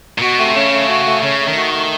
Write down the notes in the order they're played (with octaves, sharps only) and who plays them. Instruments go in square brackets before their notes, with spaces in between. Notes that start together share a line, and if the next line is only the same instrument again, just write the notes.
[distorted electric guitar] A#2
[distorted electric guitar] B2 [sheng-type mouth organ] F#4
[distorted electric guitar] C3 [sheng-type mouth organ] A3
[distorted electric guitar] C#3 [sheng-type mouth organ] C#4
[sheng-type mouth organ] A3
F#4
A3
[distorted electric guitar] C#3 [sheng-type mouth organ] C#4
[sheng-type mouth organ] A3
[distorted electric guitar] D#3
[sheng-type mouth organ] F#4
A3